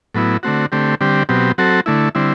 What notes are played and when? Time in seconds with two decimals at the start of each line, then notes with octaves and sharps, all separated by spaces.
0.14 A2 F#3 B3 E4
0.43 D3 A3 C4 F#4
0.72 D3 A3 C4 G4
1.01 D3 G3 C4 G4
1.29 B2 F#3 C4 G4
1.58 F#3 C4 F#4 A4
1.86 D3 A3 E4
2.15 D3 G3 C4 E4